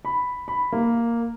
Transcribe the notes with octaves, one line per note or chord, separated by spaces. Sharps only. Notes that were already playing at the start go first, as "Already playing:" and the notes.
B5
B5
A#3